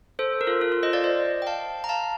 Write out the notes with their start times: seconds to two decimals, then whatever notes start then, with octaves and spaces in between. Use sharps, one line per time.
0.19 A4 C5
0.41 A#4
0.47 F4 A4
0.61 F4 A4
0.72 F4 A4
0.83 C5 D#5
0.93 D5 F5
1.04 C5 D#5
1.42 G5
1.47 F5 A5
1.84 A#5
1.89 F5 A5